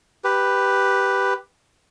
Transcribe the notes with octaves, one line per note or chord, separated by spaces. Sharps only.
G4 B4